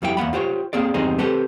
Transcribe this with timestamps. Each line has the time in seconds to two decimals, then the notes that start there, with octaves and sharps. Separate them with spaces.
0.02 F2 G3 E4 G#4 G5
0.17 E2 A#3 F#5 B5
0.33 F4 G4 C5 C#5
0.73 A#3 C4 G#4 D5
0.94 E2 G3 C4 D#4 G#4 C5
1.18 C4 G4 A4 B4 C5